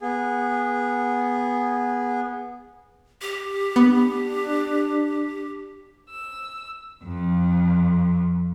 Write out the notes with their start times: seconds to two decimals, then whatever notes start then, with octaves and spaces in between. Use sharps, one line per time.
0.02 B3 G#4
3.21 G4
3.76 B3 D4
6.10 E6
7.04 F2